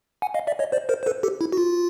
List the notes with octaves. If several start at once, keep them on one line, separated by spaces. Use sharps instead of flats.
F#5 G#5
D#5 F5
D5 E5
C#5 D#5
C5 D5
A#4 C5
C5
A4 B4
G4 A4
E4
F#4
F4